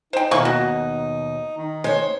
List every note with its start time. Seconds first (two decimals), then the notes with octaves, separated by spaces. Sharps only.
0.13 D#4 C5 G5
0.31 D#2 B2 E3 A#3 C#6
0.45 F#4
1.57 D#3
1.84 G#3 C5 C#5